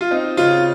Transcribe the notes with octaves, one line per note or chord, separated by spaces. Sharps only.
F4
C4 D#4
C#3 F4